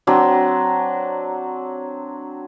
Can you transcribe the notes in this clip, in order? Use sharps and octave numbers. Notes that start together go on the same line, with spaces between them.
F#3 C4 D4